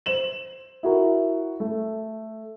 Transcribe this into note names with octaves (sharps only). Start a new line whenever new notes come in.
C5 E7 F#7
E4 F#4 A#4
A3